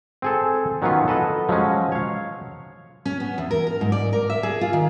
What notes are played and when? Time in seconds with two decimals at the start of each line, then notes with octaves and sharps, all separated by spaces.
0.22 C4 G#4 A4
0.82 D#3 F#3 B3 C#4 F4
1.08 A4 B4 D#5 F#5
1.49 F3 F#3 G#3 C#4
1.92 C#5 F5
3.05 C#4
3.20 B3
3.38 E2
3.51 A#4
3.67 A#4
3.81 G#2
3.92 D5
4.13 A#4
4.30 E5
4.43 G#4
4.61 F4
4.73 D#3